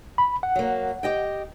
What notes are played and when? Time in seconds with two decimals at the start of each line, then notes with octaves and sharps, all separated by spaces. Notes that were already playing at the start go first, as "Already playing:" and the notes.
0.18 B5
0.43 F#5
0.56 F#3 A#3
1.03 G4 D#5 G5